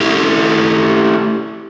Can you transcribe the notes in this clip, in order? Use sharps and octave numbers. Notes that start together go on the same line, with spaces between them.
A3 E4 G4